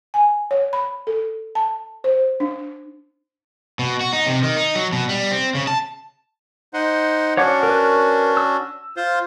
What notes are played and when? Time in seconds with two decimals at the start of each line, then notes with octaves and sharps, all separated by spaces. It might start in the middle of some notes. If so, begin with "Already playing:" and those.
0.14 G#5
0.51 C#5
0.73 B5
1.07 A4
1.55 A5
2.04 C5
2.40 D4
3.79 B2
4.01 F#4
4.13 D#4
4.26 C3
4.43 D#3
4.57 D#4
4.76 F#3
4.93 B2
5.09 G3
5.31 C4
5.55 C#3
5.67 A5
6.74 D#4 C5 F#5
7.37 C#4 D4 F#4 C#5 F#5 D6
7.63 A#4 B4
8.37 E6
8.97 F4 C5